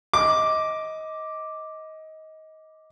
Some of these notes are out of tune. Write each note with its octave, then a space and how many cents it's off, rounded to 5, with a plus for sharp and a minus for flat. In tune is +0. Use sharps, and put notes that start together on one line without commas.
D#5 +20 D6 +0